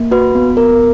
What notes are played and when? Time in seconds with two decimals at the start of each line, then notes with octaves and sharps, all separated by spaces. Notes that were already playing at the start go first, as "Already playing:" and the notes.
Already playing: A#3
0.11 F#4 B4
0.35 B3
0.57 B3 A#4